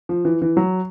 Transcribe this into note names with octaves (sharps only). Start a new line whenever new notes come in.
F3
E3
E3
F#3